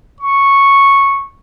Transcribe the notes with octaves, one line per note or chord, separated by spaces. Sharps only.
C#6